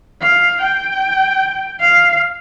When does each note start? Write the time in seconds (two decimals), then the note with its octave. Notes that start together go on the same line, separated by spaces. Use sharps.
0.21 F5
0.61 G5
1.80 F5